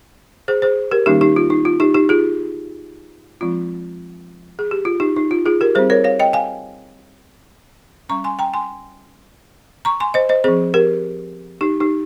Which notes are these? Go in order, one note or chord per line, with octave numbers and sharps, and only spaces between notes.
G#4 C5
G#4 C5
G4 A#4
D#3 G3 A#3 C#4 D#4 G4
D#4 G4
F4
D#4
F4
D#4 G4
D#4 G4
F4 G#4
F3 G#3 C4 F4
G#4
G4
F4
D#4 G4
D#4
F4
F4 G#4
G4 A#4
G3 C4 G#4 C5
A#4 C#5
C#5 F5
D#5 G5
F5 G#5
G3 C#4 A#5 C#6
G#5 C6
G5 A#5
G#5 C6
A#5 C#6
G#5 C6
C5 D#5
C5 D#5
F3 C4 G#4 C5
G4 A#4
D#4 G4
D#4 G4